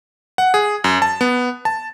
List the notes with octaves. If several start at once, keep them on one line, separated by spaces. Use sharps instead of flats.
F#5
G#4
F#2
A5
B3
A5